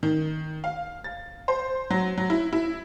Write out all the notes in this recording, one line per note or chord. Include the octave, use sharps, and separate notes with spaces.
D#3
F5
A6
C5
F#3
F#3
E4
E4